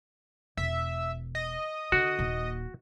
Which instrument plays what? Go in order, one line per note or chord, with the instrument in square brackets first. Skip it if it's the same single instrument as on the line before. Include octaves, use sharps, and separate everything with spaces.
[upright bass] E1 [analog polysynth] E5
[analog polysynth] D#5
[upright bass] D3 [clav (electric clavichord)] F#4
[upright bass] D#1 A#3